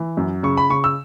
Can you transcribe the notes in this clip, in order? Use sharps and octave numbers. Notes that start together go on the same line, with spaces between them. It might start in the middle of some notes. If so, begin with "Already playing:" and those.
Already playing: E3
F#2
C#3 C#6
B5
C#3 C#6
E6